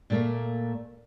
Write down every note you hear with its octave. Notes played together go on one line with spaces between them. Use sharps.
A#2 A3 A#3